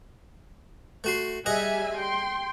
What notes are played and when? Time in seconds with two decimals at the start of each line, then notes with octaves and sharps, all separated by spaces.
1.04 A3 F#4 C6
1.46 G3 G#4 D#5 E5 F#5 G#5
1.98 G5 C6